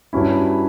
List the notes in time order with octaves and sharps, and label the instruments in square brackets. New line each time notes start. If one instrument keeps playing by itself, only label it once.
[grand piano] G2 F#3 C#4 E4